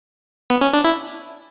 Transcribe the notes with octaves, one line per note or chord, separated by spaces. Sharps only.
B3
C#4
D4
E4